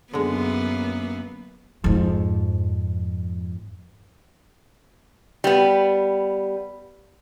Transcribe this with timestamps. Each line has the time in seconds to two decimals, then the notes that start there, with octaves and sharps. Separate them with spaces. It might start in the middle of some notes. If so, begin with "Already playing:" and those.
0.14 F#2 D3 G#3 A#3 B3
1.84 F2 G#2
5.44 G3 B3